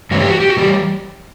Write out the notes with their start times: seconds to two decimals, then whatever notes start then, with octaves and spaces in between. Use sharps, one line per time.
0.11 G2 E3 A3 C#4 F#4
0.20 G4
0.30 F#4
0.40 G4
0.49 F#4
0.57 A2 E3 G3 G4